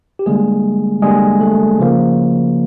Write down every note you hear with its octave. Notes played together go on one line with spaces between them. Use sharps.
G4
D3 G3 G#3 A#3 G#4
D3 G3 G#3 A#3 G#4
A3 A4
C#3 F3 A#3